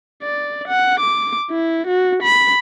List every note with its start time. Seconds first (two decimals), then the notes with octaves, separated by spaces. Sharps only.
0.23 D5
0.68 F#5
1.00 D6
1.51 E4
1.88 F#4
2.23 B5